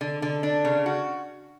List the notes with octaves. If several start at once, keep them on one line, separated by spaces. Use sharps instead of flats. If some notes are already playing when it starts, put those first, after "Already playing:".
D3
D3
D4
C#3
F#4